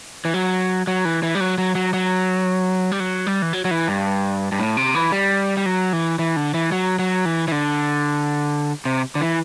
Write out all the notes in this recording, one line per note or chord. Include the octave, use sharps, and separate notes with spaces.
E3
F#3
F#3
E3
E3
G3
F#3
F#3
F#3
F#3
G3
F#3
G3
E3
F#3
F#3
E3
G2
G2
A2
C3
E3
G3
G3
F#3
E3
E3
D3
E3
F#3
F#3
E3
E3
D3
C3
D3
E3